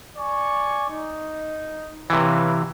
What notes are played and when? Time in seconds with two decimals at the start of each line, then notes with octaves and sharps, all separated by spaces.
0.17 D5 G#5 C#6
0.89 D#4
2.10 C3 E3 B4 C#5 F5